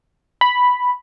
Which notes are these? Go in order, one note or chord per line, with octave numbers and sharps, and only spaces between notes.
B5